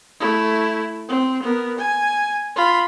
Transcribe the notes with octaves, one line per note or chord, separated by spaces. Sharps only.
A3 E4
C4
B3 A#4
G#5
F4 B5